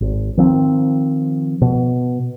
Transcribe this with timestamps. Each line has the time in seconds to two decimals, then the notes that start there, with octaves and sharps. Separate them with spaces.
0.01 G#1
0.37 D#3 F3 C4
1.61 B2